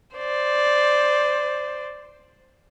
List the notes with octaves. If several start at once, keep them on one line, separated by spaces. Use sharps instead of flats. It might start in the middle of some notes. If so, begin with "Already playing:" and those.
C5 D5